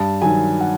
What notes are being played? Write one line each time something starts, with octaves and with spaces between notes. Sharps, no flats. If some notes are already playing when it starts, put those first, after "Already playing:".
Already playing: G2 A5
D#3 F#3 G#5
F#5